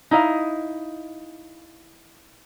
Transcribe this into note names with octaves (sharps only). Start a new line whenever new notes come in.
D#4 E4 D#5 F5